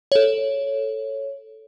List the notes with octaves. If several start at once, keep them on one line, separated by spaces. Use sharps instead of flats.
A4 C#5